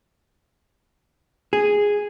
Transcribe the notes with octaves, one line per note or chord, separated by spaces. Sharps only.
G#4